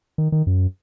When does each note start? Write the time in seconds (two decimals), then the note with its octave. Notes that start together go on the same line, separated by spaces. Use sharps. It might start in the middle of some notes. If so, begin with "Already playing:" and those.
0.18 D#3
0.32 D#3
0.47 F#2